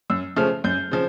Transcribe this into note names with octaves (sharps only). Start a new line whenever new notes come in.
F#2 E6
C#3 F3 A3 F6
F#2 G6
C#3 F3